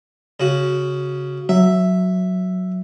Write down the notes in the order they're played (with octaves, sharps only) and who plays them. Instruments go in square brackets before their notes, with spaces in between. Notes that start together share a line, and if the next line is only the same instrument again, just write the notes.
[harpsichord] C#3 F#4
[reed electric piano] F#3 [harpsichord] E5